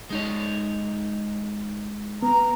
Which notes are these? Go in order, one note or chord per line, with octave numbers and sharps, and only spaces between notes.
G#3 D#4 C#5
B3 A#5